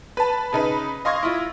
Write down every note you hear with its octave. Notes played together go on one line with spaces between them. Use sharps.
B4 A5
C#3 D#4 B4
D#5 F5 C6 C#6 G#6 A#6
E4 F4